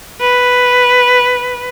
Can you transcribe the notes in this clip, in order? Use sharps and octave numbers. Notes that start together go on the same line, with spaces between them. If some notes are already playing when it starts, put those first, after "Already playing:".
B4